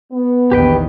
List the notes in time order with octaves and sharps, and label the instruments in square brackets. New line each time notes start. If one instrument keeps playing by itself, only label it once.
[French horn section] B3
[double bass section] A#1 E2 D#3 [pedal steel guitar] G4 B4 G5